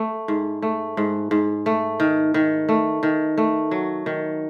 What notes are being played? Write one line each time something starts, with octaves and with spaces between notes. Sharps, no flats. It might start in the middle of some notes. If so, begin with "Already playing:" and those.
Already playing: A3
G#2
A3
G#2
G#2
A3
D#3
D#3
A3
D#3
A3
F#3
D#3